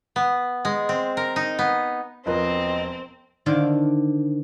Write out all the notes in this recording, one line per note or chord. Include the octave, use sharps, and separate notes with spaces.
B3
G#3
C4
A#4
D#4
B3
E1 F3 C4 A#4 B4 D#5
D3 D#3 C5 D5 F5 A5